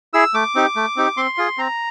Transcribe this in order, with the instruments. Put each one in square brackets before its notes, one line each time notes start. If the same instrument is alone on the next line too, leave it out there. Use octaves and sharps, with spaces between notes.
[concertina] E4 G#4 E6
A3 D6
C4 D#4 G4
A3
C4 D#4 G4
C4 C6
F4 G#4
C4 A#5